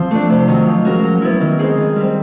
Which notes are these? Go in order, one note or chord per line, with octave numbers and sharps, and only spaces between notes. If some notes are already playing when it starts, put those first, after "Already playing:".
Already playing: F3 C4
A3 D4
C3
D#3 F#3
F3
G#3 C#4 F#4 A#4
F#3
B3 E4
D#3
G#3 C4 D#4 G#4
D#3
G3 C4